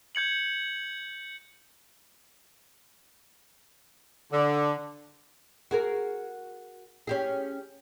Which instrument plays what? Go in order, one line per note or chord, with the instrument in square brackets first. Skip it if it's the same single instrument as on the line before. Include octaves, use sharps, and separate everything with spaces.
[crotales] G6 G#6 C#7 F#7
[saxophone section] D3
[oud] F#4 G#4 A#4
C#4 G4 G#4